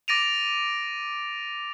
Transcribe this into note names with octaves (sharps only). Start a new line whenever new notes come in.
D6 A6 A#6 D7 D#7 F7